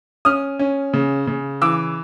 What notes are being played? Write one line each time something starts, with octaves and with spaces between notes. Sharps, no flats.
C#4 D#6 F6
C#4
C#3
C#3
E3 D6 E6